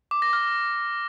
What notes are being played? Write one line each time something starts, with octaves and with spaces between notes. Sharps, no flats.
D6
A#6
F6